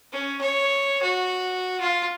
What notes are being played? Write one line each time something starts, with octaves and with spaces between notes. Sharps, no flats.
C#4
C#5
F#4
F4